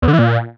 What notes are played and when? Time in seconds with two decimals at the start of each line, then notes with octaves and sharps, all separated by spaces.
0.02 E2
0.08 D3
0.13 E3
0.19 A#2